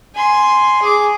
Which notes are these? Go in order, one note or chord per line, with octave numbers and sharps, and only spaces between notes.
G#5 C6
G#4 D6